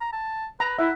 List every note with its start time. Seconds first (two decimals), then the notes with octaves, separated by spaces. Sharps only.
0.01 A#5
0.13 A5
0.60 B4 A#5
0.79 E4 E5 F#5